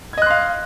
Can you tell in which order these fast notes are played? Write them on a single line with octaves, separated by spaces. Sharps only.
G#6 D#5 F#6 C6 F5